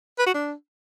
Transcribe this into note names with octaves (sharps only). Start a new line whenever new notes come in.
B4
F#4
D4